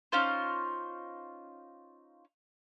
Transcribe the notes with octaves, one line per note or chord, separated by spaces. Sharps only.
C#4 D#4 F4 C5